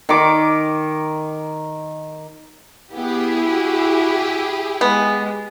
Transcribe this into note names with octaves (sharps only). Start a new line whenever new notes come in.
D#3 D6
B3 E4 G4 G#4
F#4
G#3 B3